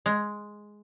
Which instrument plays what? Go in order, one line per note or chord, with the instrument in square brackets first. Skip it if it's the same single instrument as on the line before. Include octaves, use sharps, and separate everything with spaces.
[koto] G#3